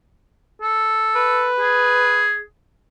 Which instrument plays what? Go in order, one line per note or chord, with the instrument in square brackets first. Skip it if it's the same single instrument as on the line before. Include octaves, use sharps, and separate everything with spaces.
[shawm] A4
[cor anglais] B4
[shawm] G#4